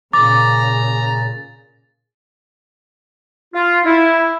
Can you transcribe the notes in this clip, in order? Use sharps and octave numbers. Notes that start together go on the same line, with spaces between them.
A#2 C#3 A#5 D6 A6
F4
E4